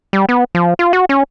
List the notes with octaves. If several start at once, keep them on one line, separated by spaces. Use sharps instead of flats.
G3
B3
F3
F4
F#4
C#4